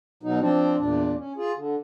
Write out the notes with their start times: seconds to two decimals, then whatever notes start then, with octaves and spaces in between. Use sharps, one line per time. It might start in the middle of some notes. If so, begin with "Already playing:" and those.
0.23 B2 F#3 D#4
0.40 F3 C4 D4
0.78 E2 A#2 D4
1.17 C#4
1.37 F4 G#4
1.57 D3